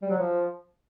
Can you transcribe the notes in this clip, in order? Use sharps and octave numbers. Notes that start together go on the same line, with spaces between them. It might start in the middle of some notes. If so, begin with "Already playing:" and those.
G3
F#3
F3